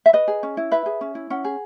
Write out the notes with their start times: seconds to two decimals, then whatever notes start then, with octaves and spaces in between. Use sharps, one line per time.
0.06 E5
0.13 B4 D#5
0.28 G#4
0.43 C#4
0.57 E4
0.71 B4 E5
0.86 G#4
1.01 C#4
1.15 E4
1.30 C#4 F#5
1.44 G#4